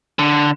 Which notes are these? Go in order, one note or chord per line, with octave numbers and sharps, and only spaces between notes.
D3